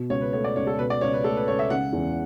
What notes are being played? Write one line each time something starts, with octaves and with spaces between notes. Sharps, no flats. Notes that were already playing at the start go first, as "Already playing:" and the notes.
Already playing: B2
C#2 C#5
B4
A3 C#5
D5
C#2 C#5
A4
B2 B4
D5
C#2 C#5
B4
A3 A4
B4
C#2 C#5
E5
C#3 F#5
E2